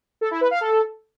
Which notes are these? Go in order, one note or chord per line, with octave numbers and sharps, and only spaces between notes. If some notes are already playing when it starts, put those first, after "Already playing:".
A4
E4
B4
F5
A4